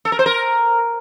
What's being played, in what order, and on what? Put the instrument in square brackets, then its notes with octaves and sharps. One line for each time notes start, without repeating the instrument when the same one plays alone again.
[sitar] A4
A#4
C5
A#4